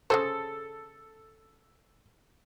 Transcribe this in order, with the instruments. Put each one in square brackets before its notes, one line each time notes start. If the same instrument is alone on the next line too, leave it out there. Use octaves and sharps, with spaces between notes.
[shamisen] C#3 G#4 C5 [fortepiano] A4